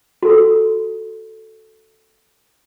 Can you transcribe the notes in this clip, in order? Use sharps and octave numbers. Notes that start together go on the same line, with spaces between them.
F#4 A4